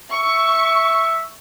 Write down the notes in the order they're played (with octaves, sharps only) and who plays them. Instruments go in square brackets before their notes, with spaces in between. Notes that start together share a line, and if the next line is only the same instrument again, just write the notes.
[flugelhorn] E5 [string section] C#6